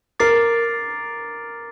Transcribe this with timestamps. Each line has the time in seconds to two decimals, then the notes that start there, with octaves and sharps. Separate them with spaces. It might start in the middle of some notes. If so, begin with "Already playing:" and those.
0.20 A#4 D6 A6 C7